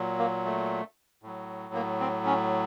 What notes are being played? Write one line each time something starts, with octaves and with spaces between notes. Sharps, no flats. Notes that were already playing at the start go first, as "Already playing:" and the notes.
Already playing: A#2 F#3
A#3
A3
A2 F#3
A#3
C4
C#4